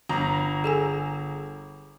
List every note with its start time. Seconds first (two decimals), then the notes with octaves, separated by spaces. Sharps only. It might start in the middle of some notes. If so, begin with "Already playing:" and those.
0.09 G1 A#5
0.64 G#4 A4 G#5